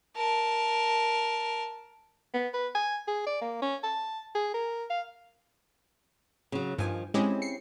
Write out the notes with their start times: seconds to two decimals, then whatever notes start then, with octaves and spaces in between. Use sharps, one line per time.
0.16 A#4 A5
2.34 B3
2.54 B4
2.75 G#5
3.08 G#4
3.27 D5
3.41 A#3
3.62 C#4
3.83 A5
4.35 G#4
4.54 A#4
4.90 F5
6.52 C#3 F#3
6.78 G2 D#3 F3 G#5
7.14 G#3 C4 C#4 E4 G4 G#4
7.42 C7 C#7